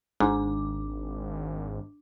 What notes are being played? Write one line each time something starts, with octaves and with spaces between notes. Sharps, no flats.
G#1 G#2 D4 D6